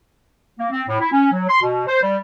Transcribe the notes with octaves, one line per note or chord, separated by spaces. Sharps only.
A#3
C4
A2
E4
C#4
F#3
C6
B2
C5
G3